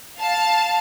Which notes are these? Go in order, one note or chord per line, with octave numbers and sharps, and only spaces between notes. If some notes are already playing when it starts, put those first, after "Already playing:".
F5 A5